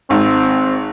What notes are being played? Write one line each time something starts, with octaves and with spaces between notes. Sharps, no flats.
G#1 C4